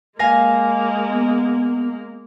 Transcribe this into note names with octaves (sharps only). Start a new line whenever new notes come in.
G#3 A#3 F5 G#5 A#6
B3